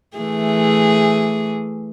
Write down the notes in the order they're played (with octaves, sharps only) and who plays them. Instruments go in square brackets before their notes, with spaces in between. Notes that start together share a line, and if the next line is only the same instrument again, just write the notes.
[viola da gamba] E3 A3 G#4